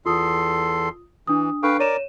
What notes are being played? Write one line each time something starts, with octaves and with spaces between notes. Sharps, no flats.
E2 F4 A4 C6 D#6
E3 D4 D#6
D4 A4 B4 F5 G5 C#6
A#4 C#5 D5 D#7 E7